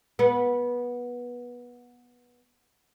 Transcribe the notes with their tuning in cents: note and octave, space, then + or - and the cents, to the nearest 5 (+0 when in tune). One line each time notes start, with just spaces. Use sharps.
B3 -20